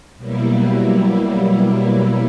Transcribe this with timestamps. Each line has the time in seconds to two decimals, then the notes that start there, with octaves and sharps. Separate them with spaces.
0.17 B2 F#3 G3 A#3 E4